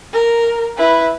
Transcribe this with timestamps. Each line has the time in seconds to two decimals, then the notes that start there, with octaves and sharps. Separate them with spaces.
0.13 A#4
0.77 E4 B4